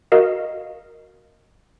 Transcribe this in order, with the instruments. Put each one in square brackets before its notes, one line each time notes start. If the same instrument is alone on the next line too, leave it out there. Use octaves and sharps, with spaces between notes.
[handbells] F#4 A#4 D#5 F5